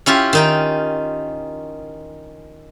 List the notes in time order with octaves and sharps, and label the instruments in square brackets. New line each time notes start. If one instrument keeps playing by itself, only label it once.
[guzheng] C#4 E4 F4 G4
D#3 D#4 G5